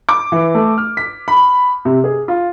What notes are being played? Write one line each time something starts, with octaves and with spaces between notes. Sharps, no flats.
D6
E3
A3
F6
B6
B5
C3
G#4
F4